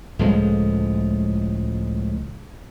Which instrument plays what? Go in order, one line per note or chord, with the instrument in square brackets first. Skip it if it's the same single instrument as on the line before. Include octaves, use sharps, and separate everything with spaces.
[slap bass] C#2 A2 F3 G#3